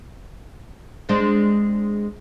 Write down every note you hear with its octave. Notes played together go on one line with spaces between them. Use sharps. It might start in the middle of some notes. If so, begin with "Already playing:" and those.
G#3 C4 D4